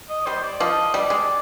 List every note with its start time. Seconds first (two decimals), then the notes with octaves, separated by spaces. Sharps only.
0.09 D#5
0.26 G3 C5
0.43 D5
0.60 F3 D#5
0.94 G3 D5
1.10 G#3